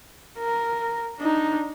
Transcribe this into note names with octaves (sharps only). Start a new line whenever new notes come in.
A#4
D4 D#4